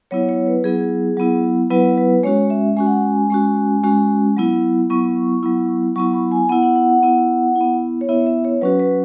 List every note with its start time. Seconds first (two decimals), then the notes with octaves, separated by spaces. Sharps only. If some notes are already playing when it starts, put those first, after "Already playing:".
0.11 F#3 B3 E4 C#5
0.29 C#5
0.47 B4
0.64 F#3 B3 E4 G#4
1.17 F#3 B3 E4
1.70 F#3 B3 E4 B4
1.98 B4
2.23 G#3 C#4 F#4 C#5
2.50 E5
2.77 G#3 C#4 F#4 G#5
2.86 F#5
2.93 G#5
3.30 G#3 C#4 F#4
3.83 G#3 C#4 F#4
4.37 F#3 B3 E4
4.90 F#3 B3 E4 C#6
5.43 F#3 B3 E4
5.96 F#3 B3 E4 C#6
6.14 B5
6.31 G#5
6.49 B3 E4 F#5
6.63 F#5
6.76 F#5
6.90 F#5
7.03 B3 E4
7.56 B3 E4
8.01 C#5
8.09 B3 E4 E5
8.27 E5
8.44 C#5
8.61 F#3 C#4 F#4 B4
8.80 B4